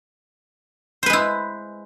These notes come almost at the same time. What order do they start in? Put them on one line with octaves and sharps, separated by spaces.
C5 B4 G#3 E4